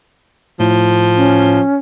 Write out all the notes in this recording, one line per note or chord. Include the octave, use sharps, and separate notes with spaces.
A2 F3
C#4